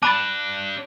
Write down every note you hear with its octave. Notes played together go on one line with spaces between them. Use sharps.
D4 G4 A5 B5 D6 F#6 A6